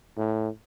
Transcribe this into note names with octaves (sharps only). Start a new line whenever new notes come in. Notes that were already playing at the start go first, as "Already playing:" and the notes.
A2